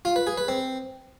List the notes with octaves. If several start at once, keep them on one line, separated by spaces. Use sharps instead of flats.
F4
B4
G#4
B4
C4